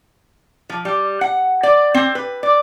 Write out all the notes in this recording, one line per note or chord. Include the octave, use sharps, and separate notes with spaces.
F3
G3
F#5
D5
C4
B4
D5